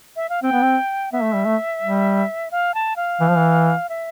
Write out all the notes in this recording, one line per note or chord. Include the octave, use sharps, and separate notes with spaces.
E5
F5
C4 G5
B3
C4
B3 E5
A3
G3
A3
G3
F5
A5
F5
E3
F3
E3
E5